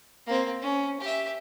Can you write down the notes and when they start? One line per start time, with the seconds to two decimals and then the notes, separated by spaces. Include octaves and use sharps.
0.27 A#3 C4
0.61 C#4
1.00 G4 E5